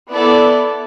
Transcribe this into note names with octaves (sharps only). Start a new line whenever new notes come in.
B3 E4 A4 D5